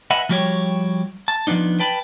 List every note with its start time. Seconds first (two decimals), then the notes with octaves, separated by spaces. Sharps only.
0.11 B4 D#5 E5 F#5 G#5 B5
0.29 F3 G3 F#4 G4 C#5
1.28 A5
1.47 F3 G#3 B3 D4 D#4
1.79 B4 G5 A5 B5